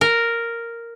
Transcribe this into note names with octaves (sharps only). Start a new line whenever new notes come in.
A#4